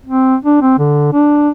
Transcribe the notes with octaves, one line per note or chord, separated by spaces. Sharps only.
C4
D4
C4
D3
D4